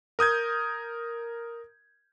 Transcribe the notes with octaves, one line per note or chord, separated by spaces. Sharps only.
A#4 D#6 G6 G#6